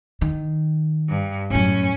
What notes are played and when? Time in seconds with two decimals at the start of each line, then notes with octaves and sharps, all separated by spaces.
0.22 D#3
1.09 G2
1.50 F#2 A2 C#4